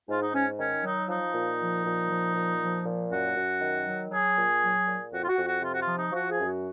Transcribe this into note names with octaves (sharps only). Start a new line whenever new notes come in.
G#2 F4
D#4
G#2 C#4
D#3 C#4
F#3 D#4
F3 D#4
A#2
F3
A#2
F3
A#2
F3
A#2
F#2 F#4
F#2
D#3
F#3
F#3 G#4
A#2
F#3
A#2
F2 F#4
F4
F#4
F2
F#4
C3 F4
F#4
F4
F3
D#4
F3 F#4
G#4
F#2
F#4